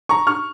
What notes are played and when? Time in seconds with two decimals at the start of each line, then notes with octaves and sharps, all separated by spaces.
0.09 A#5 C#6
0.27 C#6 F6